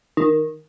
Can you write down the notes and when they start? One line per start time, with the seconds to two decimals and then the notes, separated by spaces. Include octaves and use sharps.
0.17 D#3